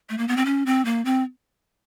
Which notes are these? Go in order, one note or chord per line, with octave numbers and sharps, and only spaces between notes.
A3
A#3
B3
C4
C#4
C4
A#3
C4